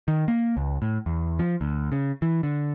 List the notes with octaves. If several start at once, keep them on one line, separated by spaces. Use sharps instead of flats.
D#3
A#3
C#2
A2
E2
F3
D2
C#3
E3
D3